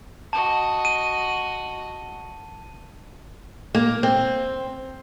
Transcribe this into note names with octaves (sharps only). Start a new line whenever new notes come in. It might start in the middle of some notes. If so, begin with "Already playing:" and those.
F#4 D#5 A5
D#7
A#3
C4